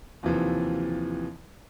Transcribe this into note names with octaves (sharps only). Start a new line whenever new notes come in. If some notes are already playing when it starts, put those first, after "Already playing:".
D#2 C3 E3 F3